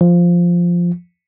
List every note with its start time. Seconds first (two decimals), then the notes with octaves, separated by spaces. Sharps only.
0.01 F3